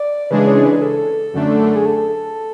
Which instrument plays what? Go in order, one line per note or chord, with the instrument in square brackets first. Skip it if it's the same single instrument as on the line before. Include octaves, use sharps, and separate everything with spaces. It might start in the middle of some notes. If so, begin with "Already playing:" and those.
Already playing: [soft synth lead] D5
[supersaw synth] C#3 E3 G#3 D4 G#4 [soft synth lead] B4
[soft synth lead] C#5
B4
G#4
A4
[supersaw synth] F#2 D3 A3 D4
[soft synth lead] G#4
A4